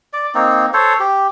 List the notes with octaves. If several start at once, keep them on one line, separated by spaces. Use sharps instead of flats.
D5
A#3 C4 D#4
A4 C5 C#5
G4